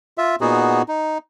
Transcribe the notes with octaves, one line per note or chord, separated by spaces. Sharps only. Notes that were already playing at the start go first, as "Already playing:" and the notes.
F4 E5
A#2 B3 D#4 F#4 G#4
D#4